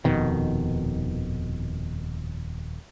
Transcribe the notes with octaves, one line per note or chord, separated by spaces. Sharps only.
D#1 F2 B2 D#3